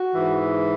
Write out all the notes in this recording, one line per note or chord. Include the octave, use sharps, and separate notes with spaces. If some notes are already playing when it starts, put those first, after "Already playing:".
Already playing: F#4
G#2 E3